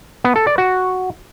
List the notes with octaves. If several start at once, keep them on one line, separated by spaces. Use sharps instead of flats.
B3
A4
D5
F#4